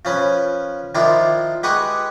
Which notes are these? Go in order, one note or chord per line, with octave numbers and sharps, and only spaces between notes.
F3 C#4 B4
D#3 F3 D4 E4 F4
G#3 G4 B4 F#5 C#6 D#6